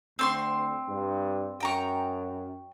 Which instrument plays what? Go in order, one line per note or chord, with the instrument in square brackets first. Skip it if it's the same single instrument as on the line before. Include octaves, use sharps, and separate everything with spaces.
[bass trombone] D2 [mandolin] C4 C6 C#6
[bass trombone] G2
[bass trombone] F#2 [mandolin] G5 A#5 C#6